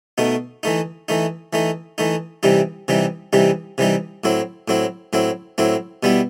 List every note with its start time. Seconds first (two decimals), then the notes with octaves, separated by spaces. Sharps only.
0.18 B2 A3 D#4
0.63 E3 A3 D#4
1.08 E3 A3 D#4
1.53 E3 A3 D#4
1.98 E3 A3 D#4
2.43 C3 E3 G3 D#4
2.88 C3 E3 G3 D#4
3.33 C3 E3 G3 D#4
3.78 C3 E3 G3 D#4
4.24 A2 F#3 C4 E4
4.68 A2 F#3 C4 E4
5.13 A2 F#3 C4 E4
5.58 A2 F#3 C4 E4
6.03 B2 G3 B3 E4